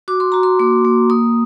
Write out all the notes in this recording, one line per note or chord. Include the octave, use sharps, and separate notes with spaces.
F#4 D6
C6
F#4 A#5
C6
A#3 D6
A#3
A#3 D#6